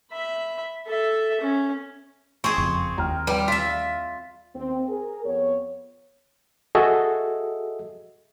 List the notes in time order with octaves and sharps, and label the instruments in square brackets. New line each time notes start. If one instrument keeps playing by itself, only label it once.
[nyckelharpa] E5 B5
A4 E5
C#4
[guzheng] C4 G#4 [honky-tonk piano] C#6
[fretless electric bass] F#1 F2 C#3
[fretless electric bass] D#2 [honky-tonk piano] G5 A#5 F6
[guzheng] G3 [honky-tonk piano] B4 G5 D6
[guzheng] F4 E5 [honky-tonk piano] B6
[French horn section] D#2 C4
G#4 A#4
F2 B3 C#5
[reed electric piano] F#4 G#4 A4 D#5 E5